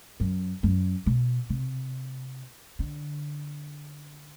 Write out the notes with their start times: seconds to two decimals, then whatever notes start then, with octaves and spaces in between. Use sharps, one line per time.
0.20 F#2
0.63 F#2
1.06 B2
1.50 C3
2.79 D3